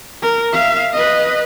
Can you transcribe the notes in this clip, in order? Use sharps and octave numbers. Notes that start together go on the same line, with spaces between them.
A#4
E5 F5
B4 D#5